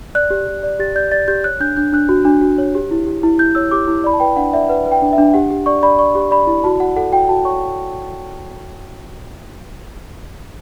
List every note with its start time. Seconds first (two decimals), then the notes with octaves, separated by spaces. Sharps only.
0.15 D5 F#6
0.30 G4
0.47 G4
0.63 D5
0.79 G4 A6
0.95 D5 G6
1.12 D5 A6
1.28 G4 G6
1.44 C#5 F#6
1.60 D4 G6
1.77 D4 G6
1.93 D4 F#6
2.09 F#4
2.25 D4
2.41 F#4
2.58 C#5
2.75 G4
2.91 E4
3.06 G4
3.23 E4
3.39 E4 G6
3.55 C#5 E6
3.71 G4 D6
3.88 E4
4.04 D5 B5
4.13 A5
4.20 B4 G5
4.36 D4 F#5
4.53 D5 E5
4.69 B4 F#5
4.86 B4
4.91 G5
5.02 D4
5.13 E5
5.18 D4
5.34 G4 F#5
5.50 G4
5.66 D5 C#6
5.83 D5 B5
5.99 D5 C#6
6.15 G4
6.31 D5 B5
6.47 E4
6.64 F#4 A5
6.80 F#4 F#5
6.96 A4 F#5
7.12 F#4 G5
7.29 F#4 A5
7.45 C#5 C#6